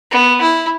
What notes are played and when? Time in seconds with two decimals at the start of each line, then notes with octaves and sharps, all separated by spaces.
0.11 B3
0.41 E4